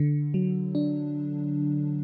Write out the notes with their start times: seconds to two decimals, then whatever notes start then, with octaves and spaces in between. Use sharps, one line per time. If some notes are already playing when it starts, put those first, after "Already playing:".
Already playing: D3
0.34 F#3
0.75 D4